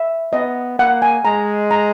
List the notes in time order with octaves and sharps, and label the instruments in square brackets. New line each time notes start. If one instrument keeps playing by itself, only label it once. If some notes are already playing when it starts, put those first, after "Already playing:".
Already playing: [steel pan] E5
[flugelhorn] B3 [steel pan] D#5
[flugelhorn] A#3 [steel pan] F#5
[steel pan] G#5
[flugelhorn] G#3 [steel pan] A#5
[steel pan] A#5